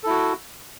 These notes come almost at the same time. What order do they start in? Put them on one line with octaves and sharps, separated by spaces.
A4 E4 F#4